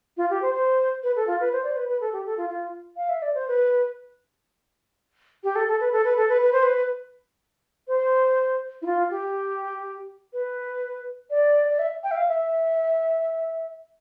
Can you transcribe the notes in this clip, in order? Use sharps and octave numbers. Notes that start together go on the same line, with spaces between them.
F4
G4
C5
C5
B4
A4
F4
B4
C5
D5
C5
B4
B4
A4
G4
A4
F4
F4
F5
E5
D5
C5
B4
G4
A4
A4
B4
A4
B4
A4
B4
B4
C5
B4
C5
E4
F4
G4
B4
D5
D5
E5
G5
E5
F5
E5